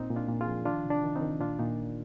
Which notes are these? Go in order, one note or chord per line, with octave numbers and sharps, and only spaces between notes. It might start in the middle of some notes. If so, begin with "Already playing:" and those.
Already playing: A#2 C4 D#4
A#2
D4 F4
A#2
F4 G#4
F3
D#3 D4 F4
C3
D4
D#3
C4 D#4
D#3
A#2 D4 F4
A#2 D#4